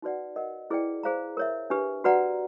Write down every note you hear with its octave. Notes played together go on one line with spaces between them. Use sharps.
D#4 F#4 B4 D5 F#5
A#4 D#5 F#5
E4 G#4 B4 D5 G5
G#4 C5 F5 A#5
A#4 C#5 E5
D4 G4 B4
F#4 B4 D5 F#5 A#5